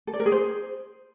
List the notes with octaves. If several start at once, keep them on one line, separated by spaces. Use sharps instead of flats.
A4
D5
A#4
G#4
C5